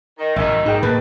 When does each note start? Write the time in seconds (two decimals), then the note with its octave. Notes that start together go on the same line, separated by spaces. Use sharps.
0.18 D#3
0.36 A1 F#2 D#3 E5 G#5
0.66 G#2 D#4 G#4 G5
0.83 A2 A#3 B4 A5